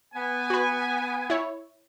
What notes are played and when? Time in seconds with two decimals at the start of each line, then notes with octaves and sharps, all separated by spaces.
0.14 B3 G#5
0.50 F#4 B4
1.30 E4 C#5